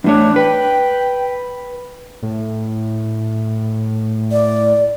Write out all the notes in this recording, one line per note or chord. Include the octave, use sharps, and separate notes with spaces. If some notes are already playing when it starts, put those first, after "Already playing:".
E2 A2 D4 C#5
B4 G5
A2
D5